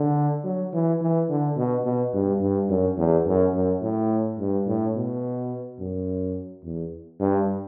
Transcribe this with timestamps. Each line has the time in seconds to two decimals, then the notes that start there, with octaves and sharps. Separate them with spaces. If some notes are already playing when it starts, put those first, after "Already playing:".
Already playing: D3
0.44 F#3
0.73 E3
1.01 E3
1.29 D3
1.57 B2
1.85 B2
2.13 G2
2.42 G2
2.70 F#2
2.97 E2
3.27 F#2
3.54 F#2
3.82 A2
4.39 G2
4.68 A2
4.96 B2
5.80 F#2
6.64 E2
7.20 G2